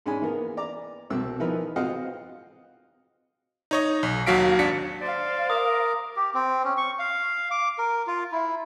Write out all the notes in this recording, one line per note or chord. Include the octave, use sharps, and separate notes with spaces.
G#2 G#3 C#4 D4 G#5 B5
E3 A#3 B3 A#4
D5 A#5 D6
C2 B2 C4 E6
E3 F3 B3 D#4 A#4 B4
C4 F4 F#4 D#5 F5 F#5
D#4 C#5 D#5
B1
D#2 F#3 F#4 F5 B6 D7
G#1 D4 B6 C#7
C5 D5 F5
A#4 A#5 D6 D#6
G4
C4
C#4
C#6
F5
D6
A#4
F4
E4